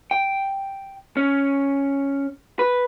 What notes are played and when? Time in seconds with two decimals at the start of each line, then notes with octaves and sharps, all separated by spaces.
0.11 G5
1.17 C#4
2.59 B4